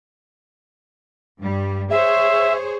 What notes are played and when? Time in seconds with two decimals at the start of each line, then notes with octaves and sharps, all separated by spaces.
1.40 G2 G3
1.90 G#4 C5 C#5 E5